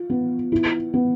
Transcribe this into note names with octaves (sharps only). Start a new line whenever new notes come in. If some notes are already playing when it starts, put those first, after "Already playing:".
Already playing: F4
B3
E4
B3